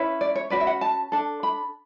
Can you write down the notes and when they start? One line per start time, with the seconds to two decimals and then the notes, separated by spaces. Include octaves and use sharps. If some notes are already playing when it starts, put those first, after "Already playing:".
Already playing: C#4 E4 B4
0.21 D5
0.35 C#5
0.50 C#4 F#4 B4 D5
0.60 E5
0.67 F#5
0.81 A5
1.12 D4 A4
1.43 B5